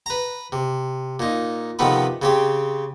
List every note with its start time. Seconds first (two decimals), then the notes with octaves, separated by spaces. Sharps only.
0.06 B4 A#5
0.52 C3
1.20 A#2 D#4
1.79 C3 D#3 F3 A3 B3 B4
2.22 C#3 C4 G4